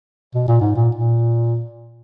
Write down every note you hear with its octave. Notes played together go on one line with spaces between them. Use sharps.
B2
A#2
G#2
A#2
A#2